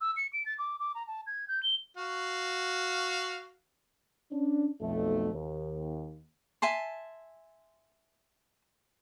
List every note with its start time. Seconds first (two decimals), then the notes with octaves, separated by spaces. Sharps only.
0.01 E6
0.17 C#7
0.33 D7
0.46 A6
0.58 D6
0.80 D6
0.95 A#5
1.07 A5
1.27 G#6
1.48 G6
1.63 G7
1.97 F#4 F5
4.32 C#4 D4
4.81 B1 F2 A3
5.34 D#2
6.62 E5 G#5 A5 C6